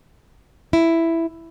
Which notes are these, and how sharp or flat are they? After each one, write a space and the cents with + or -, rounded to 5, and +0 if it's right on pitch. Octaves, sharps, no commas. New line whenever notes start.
E4 +5